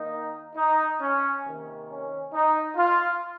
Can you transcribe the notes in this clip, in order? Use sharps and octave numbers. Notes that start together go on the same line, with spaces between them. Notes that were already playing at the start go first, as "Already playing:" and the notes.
Already playing: D#3 A#3 D#4
D#4
C#4
C3 D#3 A#3
C#4
D#4
F4